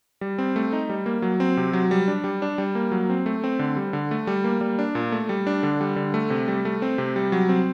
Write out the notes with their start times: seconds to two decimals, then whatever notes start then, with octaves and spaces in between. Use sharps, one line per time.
0.21 G3
0.38 C4
0.56 A3
0.73 D#4
0.89 G3
1.06 A#3
1.22 F#3
1.40 C4
1.57 C3
1.73 F#3
1.91 G3
2.08 D4
2.24 G3
2.42 D4
2.58 G3
2.75 A#3
2.92 F#3
3.10 C4
3.26 A3
3.44 C4
3.59 D3
3.77 G3
3.93 D3
4.11 A3
4.27 G3
4.44 A#3
4.61 G3
4.79 D4
4.95 A#2
5.12 A3
5.29 G3
5.47 D4
5.63 D3
5.81 G3
5.96 D3
6.14 A3
6.30 C3
6.48 G3
6.65 A3
6.82 C4
6.98 C3
7.16 G3
7.32 F#3
7.49 C4